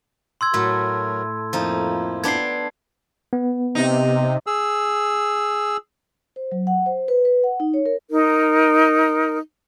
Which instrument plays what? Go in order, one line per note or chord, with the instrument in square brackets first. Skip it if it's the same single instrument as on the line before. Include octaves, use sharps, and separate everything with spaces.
[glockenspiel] C6 E6 G#6
[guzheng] A2 A3 [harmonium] F#3 F#4 A#4
[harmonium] F2 A#3 E4 [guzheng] F3 D#4
[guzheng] B3 D4 G5 [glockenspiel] G#6 C7
[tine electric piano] B3
[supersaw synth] C3 [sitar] D#4
[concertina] G#4 E6
[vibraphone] C5
F#3
F#5
C5
B4
B4
F#5
D#4
C#5
A#4
[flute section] D#4 A#4